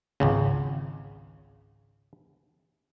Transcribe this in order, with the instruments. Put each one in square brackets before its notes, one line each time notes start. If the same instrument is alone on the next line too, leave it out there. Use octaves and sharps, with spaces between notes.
[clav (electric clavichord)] G#1 C#2 C#3